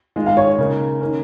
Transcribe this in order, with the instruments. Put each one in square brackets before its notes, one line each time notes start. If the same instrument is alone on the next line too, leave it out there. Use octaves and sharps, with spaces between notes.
[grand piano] D#3 G#3 F4
[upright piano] F5
C#5
[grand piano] C#3 A#3 D#4
D#3 A#3 C#4